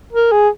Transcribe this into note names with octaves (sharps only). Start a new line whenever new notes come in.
A#4
G#4